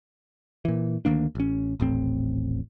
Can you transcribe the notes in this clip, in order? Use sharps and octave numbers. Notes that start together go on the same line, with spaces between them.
A#2 E3
D2 D#3 A#3 D4
A1 C#4
D#1 A1 A2 C4